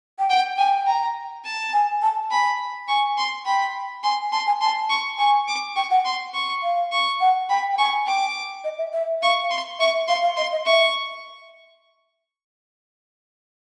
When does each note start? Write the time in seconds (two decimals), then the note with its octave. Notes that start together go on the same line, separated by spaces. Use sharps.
0.19 G5
0.30 F#5 G5
0.58 G5 G#5
0.86 A#5
1.44 A5
1.73 G#5
2.02 A5
2.31 G#5 B5
2.88 G#5 C#6
3.17 C6
3.45 G5 B5
4.03 G#5 C6
4.32 A5 C6
4.47 G#5
4.61 A5 C6
4.89 C#6
5.19 G#5 C#6
5.48 D6
5.76 G5 C#6
5.90 F#5
6.05 C6
6.34 C#6
6.63 F5
6.91 C#6
7.21 F#5
7.49 G5 B5
7.73 G5
7.78 G#5 C#6
8.06 G5 D6
8.64 D#5
8.78 E5
8.93 E5
9.22 F5 C#6
9.50 C6
9.79 E5 C#6
10.08 F5 C6
10.22 F5
10.36 D#5 C6
10.51 D#5
10.66 E5 C#6